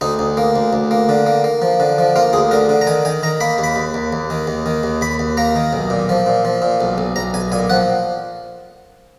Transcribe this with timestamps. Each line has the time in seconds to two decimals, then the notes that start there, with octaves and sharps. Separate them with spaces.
0.01 D2 D#4
0.19 D2
0.37 A#3
0.56 D2
0.73 D2
0.91 A#3
1.09 D3
1.26 A#3
1.44 A#3
1.62 F3
1.80 D3
1.98 F3
2.16 A#3 F4
2.33 D2 G#4
2.51 D3 A#4
2.69 D3
2.81 A#5
2.87 D#3 G#5
3.05 D#3 G#5
3.23 D#3 A#5
3.41 A#3 B5
3.58 D#2
3.64 B5
3.76 D#2
3.94 D#2
4.13 D#2
4.30 D#3
4.47 D#2
4.66 D#3
4.83 D#2
5.01 D#2 B5
5.19 D#2
5.37 A#3 A#5
5.56 D#3
5.73 B1
5.90 A#2
6.09 F3
6.26 A#2
6.45 F3
6.62 A#2
6.81 B1
6.98 B1
7.16 B1 A#5
7.34 B1 G#5
7.52 A#2 G#5
7.70 F3 F#5